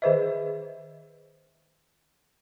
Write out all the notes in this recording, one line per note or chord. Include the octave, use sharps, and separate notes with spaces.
D#3 G#4 B4 C5 D#5 E5